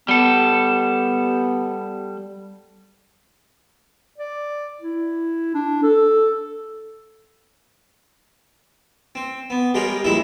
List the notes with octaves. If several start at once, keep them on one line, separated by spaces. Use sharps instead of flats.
G3 B3 A4
D5
E4
D4
A4
C4
B3
G3 G#3 G4 G#4 A#4 C#5
A#1 G3 G#3 E4 G#4 E5